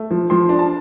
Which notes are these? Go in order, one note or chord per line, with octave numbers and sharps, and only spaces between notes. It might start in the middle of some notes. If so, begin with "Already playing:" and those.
Already playing: A3
F3
F3 C6
D4
A5